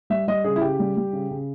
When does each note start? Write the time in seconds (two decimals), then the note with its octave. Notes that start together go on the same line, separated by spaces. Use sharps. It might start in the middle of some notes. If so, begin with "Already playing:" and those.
0.10 G3 E5
0.28 G3 D#5
0.44 C#3 G#4
0.56 E4
0.62 C#3 G4
0.79 G3
0.97 G3
1.13 C#3
1.31 C#3